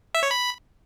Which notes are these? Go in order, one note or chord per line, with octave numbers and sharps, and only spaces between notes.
E5
C#5
B5